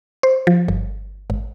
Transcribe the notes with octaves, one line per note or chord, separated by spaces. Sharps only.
C5
F3
G1
G#1